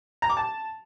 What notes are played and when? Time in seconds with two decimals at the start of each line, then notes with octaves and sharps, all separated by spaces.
0.22 A#5
0.30 D6
0.37 A5